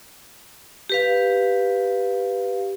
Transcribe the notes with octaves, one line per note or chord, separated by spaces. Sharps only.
G4 B4 F5